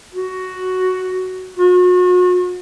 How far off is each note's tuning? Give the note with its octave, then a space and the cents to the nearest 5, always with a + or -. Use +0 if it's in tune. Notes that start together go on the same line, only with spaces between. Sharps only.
F#4 +5
F#4 -40